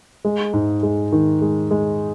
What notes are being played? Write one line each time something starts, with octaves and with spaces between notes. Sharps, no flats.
G#3
G#2
G#3
D#3
G#3
G#3